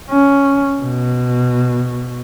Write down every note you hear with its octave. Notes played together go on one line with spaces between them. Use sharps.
C#4
B2